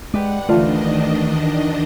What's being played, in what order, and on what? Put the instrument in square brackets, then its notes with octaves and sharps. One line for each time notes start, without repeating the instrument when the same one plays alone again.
[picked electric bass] G#3 [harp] G4 B4 D5 [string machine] F#5
[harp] D2 E3 [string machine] D#3 D4 D#5 [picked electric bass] A3 [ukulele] F4 D5